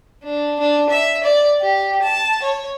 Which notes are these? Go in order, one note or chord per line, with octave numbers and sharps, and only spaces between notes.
D4
D4
E5
D5
G4
A5
C#5